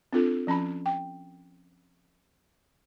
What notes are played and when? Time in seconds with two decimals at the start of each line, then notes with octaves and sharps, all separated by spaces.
0.13 C4 D4 F4 A4
0.47 F3 C#4 A5 B5
0.86 G5